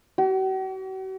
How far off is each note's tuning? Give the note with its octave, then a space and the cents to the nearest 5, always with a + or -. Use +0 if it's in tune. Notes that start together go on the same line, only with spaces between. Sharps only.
F#4 +45